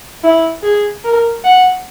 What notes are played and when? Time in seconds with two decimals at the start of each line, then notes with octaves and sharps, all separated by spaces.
0.24 E4
0.63 G#4
1.04 A#4
1.44 F#5